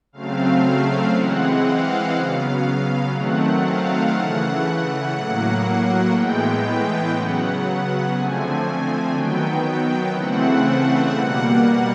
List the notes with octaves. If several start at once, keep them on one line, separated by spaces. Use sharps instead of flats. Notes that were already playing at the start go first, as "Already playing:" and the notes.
C#3 F#3 A3 C4 F5
E3 G#3 C4 F#5
F5
C#3 F#3 B3
D#3 F#3 A3 C4 F#5
F5
C#3 E3 A3 F#5
A2 F#3 A#3 F#5
A2 E3 G#3 B3 G5
C#3 F#3 B3 F#5
D3 F3 A3 C4 G#5
D#3 F#3 B3 G5
C#3 E3 A3 C4 F#5
B2 G3 A#3 F#5